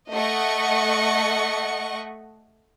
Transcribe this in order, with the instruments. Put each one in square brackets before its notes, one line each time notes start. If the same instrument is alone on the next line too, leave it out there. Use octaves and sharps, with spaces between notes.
[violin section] A3 D#5 F#5 C#6